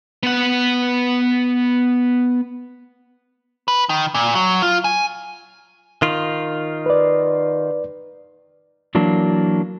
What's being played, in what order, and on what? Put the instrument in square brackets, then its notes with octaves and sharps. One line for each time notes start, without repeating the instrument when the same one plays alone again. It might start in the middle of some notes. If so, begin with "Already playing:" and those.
[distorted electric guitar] B3 F#5
[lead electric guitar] B4
D#3
A#2
F#3
F4
G#5
[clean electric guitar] D#3 F4
[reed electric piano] B4 D5
[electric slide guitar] E3 F#3 A#3 D4